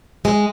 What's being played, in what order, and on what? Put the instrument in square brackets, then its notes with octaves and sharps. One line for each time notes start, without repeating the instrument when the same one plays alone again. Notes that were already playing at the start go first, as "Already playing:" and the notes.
[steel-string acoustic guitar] G#3